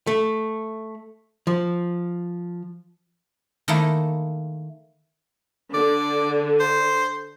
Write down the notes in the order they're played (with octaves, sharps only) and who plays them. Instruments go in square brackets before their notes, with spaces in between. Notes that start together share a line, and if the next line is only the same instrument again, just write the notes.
[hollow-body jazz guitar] A3
F3
[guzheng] D#3 A3 A#3 D#4 E4
[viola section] D3 [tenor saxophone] D5
[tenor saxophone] C5